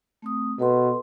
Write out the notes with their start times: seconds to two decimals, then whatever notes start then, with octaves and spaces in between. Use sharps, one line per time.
0.22 A3 C4 D#6
0.59 B2 A4 B4 C6